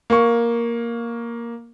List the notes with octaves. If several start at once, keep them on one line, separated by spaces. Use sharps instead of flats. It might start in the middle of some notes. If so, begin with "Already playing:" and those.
A#3 C#6